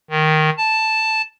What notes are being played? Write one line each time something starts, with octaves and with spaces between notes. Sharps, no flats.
D#3
A5